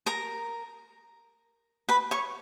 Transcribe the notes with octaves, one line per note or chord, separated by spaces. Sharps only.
A#4 A#5
B4 B5
C#5 C#6